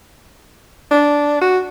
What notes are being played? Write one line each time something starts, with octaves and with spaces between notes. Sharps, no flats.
D4
F#4